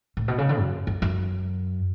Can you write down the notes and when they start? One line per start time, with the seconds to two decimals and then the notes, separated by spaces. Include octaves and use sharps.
0.17 A2
0.28 B2
0.38 C#3
0.49 D3
0.59 F#2
0.87 F#2
1.02 F#2